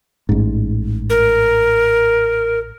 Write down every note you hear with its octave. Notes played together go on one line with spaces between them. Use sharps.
A1 G#2
A#4